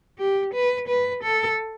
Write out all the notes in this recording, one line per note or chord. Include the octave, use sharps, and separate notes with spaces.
G4
B4
B4
A4